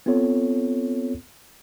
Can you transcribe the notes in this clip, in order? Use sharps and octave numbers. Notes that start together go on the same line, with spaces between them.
B3 C4 F4 A4 C#5